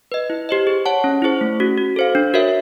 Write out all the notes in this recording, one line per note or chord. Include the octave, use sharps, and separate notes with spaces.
B4 D#5
E4
G4 C5 D#5
G#4
C#5 F#5 A5
C#4
E4 G#4 C5
A3
C#4 F#4
F#4
A4 C5 F5
D4
F#4 A#4 C#5 E5